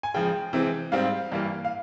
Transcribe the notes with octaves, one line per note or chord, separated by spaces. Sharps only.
G#5
C#3 F3 G#3 G5
C3 E3 G#3 C4
G#2 G3 C4 F5
G2 E3 G3 A#3
F5